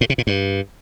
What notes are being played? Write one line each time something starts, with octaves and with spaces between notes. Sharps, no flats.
A2
C3
A#2
G2